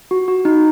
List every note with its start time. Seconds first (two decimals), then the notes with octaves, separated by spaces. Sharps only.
0.11 F#4
0.28 F#4
0.45 D#4